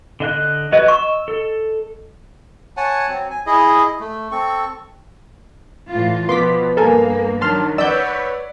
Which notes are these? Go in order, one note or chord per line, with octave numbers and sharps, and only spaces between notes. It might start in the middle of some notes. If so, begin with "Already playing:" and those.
D3 D#5 F#6
F#3 F#4 B4 D#5
C#6 E6
A4
C#5 F#5 G#5 A5
F#3 C4
G#5
E4 G#4 D#5
A3
C4 A4 C#6
A2 E3 F4
B2 F3 B3 C6 D6 B6
G2 A#3 A4 A#4 G#5
D#3 F#3 D4 A5 C6 F6
B4 C#5 D5 F#5 E6 G6